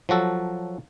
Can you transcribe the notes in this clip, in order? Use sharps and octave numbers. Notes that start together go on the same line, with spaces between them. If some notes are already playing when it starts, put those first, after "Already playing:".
F3 F#3 F#4 A4